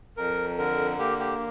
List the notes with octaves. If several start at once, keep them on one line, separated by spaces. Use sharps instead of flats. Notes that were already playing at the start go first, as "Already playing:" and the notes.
F2 A#4
D3 A#4
A#3 G4
G4